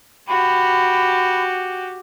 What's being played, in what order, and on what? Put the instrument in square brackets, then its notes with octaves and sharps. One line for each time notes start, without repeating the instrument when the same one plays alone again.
[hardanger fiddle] F#4 G4 [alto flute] B5